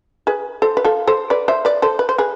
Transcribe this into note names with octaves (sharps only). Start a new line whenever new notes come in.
G#4 B4
A4 C5
B4
F4 A4
A4 C5
B4 D5
C5 E5
B4 D5
A4 C5
B4
C5
G#4 B4